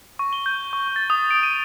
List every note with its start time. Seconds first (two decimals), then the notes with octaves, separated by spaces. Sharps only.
0.19 C#6
0.33 G7
0.46 G6
0.73 C#6
0.96 A6
1.10 D#6
1.31 D7
1.43 D#7